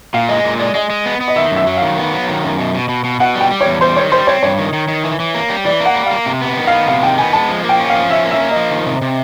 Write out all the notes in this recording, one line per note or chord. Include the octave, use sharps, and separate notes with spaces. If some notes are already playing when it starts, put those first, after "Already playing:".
A#2 F5
G#3 D#5
A#2
G#3 D5
G#3 D#5
G#3
B3
B3
D#5
D#3 E5
F#2
E5
F#3
D#3 F5
B3
F#3
D#3
F#2
B2
B2
B2
B2
B2 F#5
G3
G5
G3
E2 C#5
G3 C5
D#3 C#5
G3 C5
C4 C#5
G2 C#5
D#3
D#3
D#3
E3
E3
A#3
G3
E3 D5
A#3
F#5
G3
A#3 F5
C3
B3
D#3
F5
B3
C3 F5
D#3 G5
B3 G#5
G#3 A5
F3
A#3
G5
C#4
F5
F3
C#4 E5
A#3
E5
A#3
D#5
F3
D#3
C3
C3